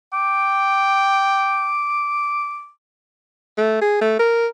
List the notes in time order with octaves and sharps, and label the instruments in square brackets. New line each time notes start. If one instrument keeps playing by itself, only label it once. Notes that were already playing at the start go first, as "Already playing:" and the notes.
[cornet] G5 [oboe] D6
[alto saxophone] A3
G#4
A3
A#4